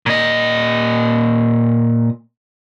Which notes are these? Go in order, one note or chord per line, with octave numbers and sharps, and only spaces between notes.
A#2 D#5